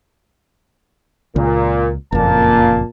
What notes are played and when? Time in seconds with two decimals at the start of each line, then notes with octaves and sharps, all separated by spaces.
1.36 C#2 A#2
2.12 F#1 F2 A#2 A#3 A5